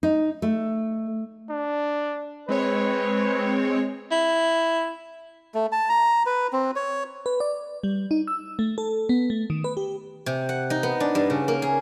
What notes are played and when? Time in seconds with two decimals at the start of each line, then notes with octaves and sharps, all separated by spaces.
0.03 D#4
0.42 A3
1.50 D4
2.49 G#3 C4 B4 C#5
4.11 E4
5.54 A3
5.72 A5
5.89 A#5
6.26 B4
6.53 C4
6.76 C#5
7.26 B4
7.40 D5
7.83 G3
8.11 D#4
8.27 E6
8.59 A3
8.78 A4
9.09 B3
9.30 A3
9.50 D#3
9.64 B4
9.77 G4
10.26 C3
10.49 F#5
10.70 D#4
10.83 B3
11.00 D4
11.15 G2
11.30 C#3
11.48 A#3
11.62 G#4